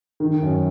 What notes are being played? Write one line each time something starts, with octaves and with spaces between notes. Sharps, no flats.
D#3
F#2